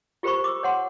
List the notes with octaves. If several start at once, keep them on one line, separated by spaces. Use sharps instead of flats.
F4 G4 A#4 C5 B5 C#6
D6 E6
C#5 F#5 C6